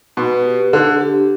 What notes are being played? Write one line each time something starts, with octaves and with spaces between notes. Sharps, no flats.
B2 B4
G4
D3 D4
G4